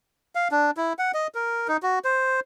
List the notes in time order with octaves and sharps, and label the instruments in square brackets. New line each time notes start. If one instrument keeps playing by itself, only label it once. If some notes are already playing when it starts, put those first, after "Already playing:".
[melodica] F5
D4
E4
F#5
D#5
A#4
D#4
F#4
C5